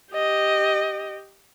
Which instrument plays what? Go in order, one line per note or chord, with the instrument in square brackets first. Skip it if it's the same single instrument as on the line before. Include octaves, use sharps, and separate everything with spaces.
[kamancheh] G4 D#5